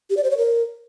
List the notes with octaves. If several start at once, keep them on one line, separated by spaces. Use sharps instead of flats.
G4
D5
C5
C#5
A#4